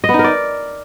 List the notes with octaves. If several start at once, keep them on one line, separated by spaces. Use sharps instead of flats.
D#5
B3
D#4
A#4
D5